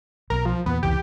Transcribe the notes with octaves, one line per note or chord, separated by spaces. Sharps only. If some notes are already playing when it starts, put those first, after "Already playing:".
B1 B2 A#4
F3
E2 A#2 B3
F1 C#2 E3 G4